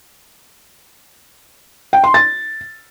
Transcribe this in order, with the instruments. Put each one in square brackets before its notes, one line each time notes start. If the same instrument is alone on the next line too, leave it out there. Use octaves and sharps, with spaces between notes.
[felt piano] G5
C6
A6